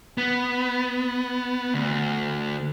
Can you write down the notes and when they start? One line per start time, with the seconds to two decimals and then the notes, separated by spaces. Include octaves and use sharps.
0.18 B3
1.74 D2